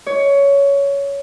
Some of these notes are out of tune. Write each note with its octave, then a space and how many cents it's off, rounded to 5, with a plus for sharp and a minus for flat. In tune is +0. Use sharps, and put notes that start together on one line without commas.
C#5 +15